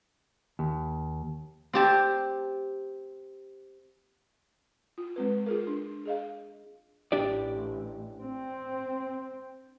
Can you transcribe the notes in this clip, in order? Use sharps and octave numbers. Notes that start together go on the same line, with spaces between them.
D#2
C4 G4 A5
F4
G#3 C4 B4
F4 G#4 A#4
D4
G#4 D#5 F5
A1 D4 G4 D5
C4